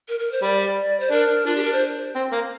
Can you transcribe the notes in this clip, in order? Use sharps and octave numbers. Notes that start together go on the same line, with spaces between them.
A#4
A#4
C5
G3 D5
C5
D4 A#4
D4 F4
G4
A#4
C5
C4
A#3